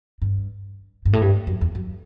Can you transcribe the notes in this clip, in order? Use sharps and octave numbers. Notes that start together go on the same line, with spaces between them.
G2
G2
A2
G2
F#2
E2
F#2